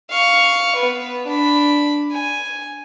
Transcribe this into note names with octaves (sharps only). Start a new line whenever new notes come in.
F5 C#6
B3 B4
D4 B5
G#5